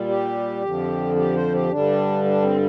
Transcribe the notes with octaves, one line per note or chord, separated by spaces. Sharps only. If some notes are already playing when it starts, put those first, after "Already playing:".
Already playing: A#2 G3
G4
F2 D3 F3
G4
C5
G4
G2 D3 G3 D4
D4
C4